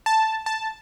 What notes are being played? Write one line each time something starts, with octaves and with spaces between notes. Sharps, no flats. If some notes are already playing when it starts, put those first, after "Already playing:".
A5
A5